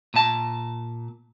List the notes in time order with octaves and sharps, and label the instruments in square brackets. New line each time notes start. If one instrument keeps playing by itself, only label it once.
[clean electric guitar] A#2 A5